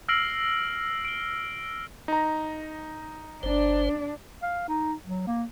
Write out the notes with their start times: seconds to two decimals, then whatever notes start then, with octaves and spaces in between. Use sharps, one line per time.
0.09 E6 F6 A#6 C7 D7 F#7
1.05 D7 G7
2.08 D#4 A#5
3.43 G1 D4 C5
4.42 F5
4.68 D#4
5.05 F#3
5.27 A#3